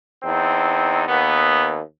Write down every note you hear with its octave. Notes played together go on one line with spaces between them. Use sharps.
E2 C4 D#4
D#2 B3